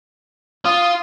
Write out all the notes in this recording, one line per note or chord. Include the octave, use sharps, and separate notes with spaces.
F4 D#6